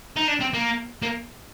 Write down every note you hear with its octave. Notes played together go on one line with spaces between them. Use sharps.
D#4
D4
C4
A#3
A#3